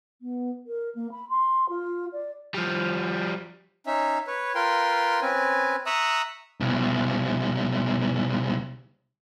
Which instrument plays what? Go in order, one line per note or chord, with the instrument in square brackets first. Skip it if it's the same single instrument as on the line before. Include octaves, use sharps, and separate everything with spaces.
[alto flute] B3
A#4
A#3
B5
C6
F4
D5
[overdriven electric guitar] F3 G3
[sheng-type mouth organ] C#4 D#4 E5
B4 C#5
F4 A#4 B4 G5 C6
C4 C#4 B4 G#5
E5 A#5 C#6 D#6 E6 F#6
[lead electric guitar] C2 B2